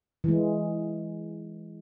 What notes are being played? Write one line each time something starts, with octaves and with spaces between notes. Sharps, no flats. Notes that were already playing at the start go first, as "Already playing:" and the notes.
E3 G#3